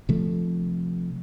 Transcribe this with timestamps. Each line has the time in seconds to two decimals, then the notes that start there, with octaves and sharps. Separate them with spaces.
0.09 C3 F3 A3